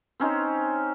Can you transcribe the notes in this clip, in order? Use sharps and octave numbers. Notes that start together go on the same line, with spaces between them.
C4 C#4 D#4 C5